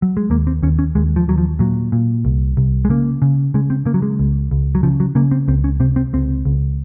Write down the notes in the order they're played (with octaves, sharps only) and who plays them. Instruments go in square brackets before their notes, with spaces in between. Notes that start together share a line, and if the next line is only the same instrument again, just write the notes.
[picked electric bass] F#3
G#3
D#2 A#3
C4
D#2 C#4
C#4
D#2 G#3
F3
D#2 F#3
F3
A#2 F#3
A#2
C2
C2
G#3
C#3 A#3
C#3
C#3 G#3
C4
C#3 A#3
F#3
G#3
C#2
C#2
F#3
C#3 F3
F#3
C#3 A#3
C4
C#2 C4
C#4
C3 C4
C4
C#2 C4
C#2